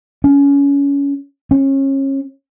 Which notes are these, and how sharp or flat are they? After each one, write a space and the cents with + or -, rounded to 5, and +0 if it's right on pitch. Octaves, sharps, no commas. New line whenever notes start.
C#4 +25
C#4 -30